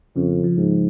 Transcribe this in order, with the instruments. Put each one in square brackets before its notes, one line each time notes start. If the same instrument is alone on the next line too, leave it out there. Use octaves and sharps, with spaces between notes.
[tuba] F2 [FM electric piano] C#3
[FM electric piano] F3
[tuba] G#2